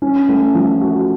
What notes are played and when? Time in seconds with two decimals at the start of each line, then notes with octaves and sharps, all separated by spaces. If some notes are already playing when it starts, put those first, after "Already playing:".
0.02 C#4
0.29 A3
0.55 F3
0.81 F#4